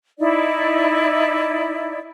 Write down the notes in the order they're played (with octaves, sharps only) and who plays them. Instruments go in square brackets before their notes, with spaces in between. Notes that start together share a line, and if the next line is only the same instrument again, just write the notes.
[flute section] D#4 E4 D5